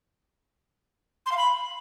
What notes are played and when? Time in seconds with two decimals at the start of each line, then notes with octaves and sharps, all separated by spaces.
1.26 C6
1.32 F5
1.37 B5